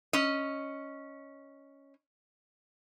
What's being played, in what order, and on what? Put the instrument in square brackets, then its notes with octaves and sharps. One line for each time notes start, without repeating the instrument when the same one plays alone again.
[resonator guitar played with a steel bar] C#4 D#5